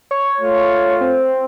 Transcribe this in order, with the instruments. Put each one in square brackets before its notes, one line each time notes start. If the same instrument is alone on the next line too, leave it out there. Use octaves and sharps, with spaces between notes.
[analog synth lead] C#5
[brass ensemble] A3 F4
[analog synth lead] C4